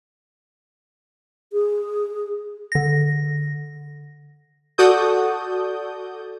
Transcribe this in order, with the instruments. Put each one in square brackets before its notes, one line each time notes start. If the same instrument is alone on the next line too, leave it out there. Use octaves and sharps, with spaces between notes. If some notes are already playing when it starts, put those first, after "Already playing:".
[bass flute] G#4
[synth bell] D3 A#6
[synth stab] F#4 A4 D5 D#6 G6